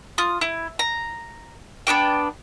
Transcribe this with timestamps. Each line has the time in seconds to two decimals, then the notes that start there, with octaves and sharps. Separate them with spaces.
0.18 F4 D#6
0.41 E4
0.79 A#5
1.87 B3 D4 F#4 G5